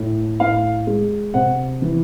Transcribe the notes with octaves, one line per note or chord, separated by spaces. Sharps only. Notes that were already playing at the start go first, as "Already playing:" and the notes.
Already playing: A2
A2 F5
G#3
C3 F#5
E3